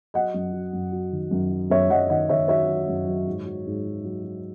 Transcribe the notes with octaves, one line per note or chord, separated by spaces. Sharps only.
F#3 D#5 F#5
F#2
F#3
F#2
F#3
D#3
F#2
F#3
F#2 C#5 E5
F#2 D#5 F#5
D#3 D#5 F#5
D#3 C#5 E5
F#3 C#5 E5
F#3
F#2
F#3
G#2
F#3
G#2
F#3
F#3
F#3